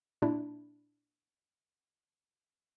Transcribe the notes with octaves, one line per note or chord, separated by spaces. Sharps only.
A#2 D4 E4